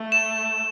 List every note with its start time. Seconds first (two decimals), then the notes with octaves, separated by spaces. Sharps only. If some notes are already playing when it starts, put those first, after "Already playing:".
Already playing: A3
0.12 E7